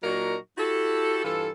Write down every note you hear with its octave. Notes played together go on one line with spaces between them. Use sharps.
A#2 F#3 D4 D#4 F#4 A#4
E4 F#4 G4 A4
G2 E3 F4 A4